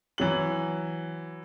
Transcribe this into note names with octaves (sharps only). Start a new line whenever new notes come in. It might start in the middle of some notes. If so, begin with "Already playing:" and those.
E3 F#3 F#7